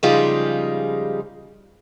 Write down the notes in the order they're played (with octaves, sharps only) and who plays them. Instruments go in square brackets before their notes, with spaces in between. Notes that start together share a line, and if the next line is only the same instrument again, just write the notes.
[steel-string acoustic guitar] C#3 F3 G3 G#3 D#4 F4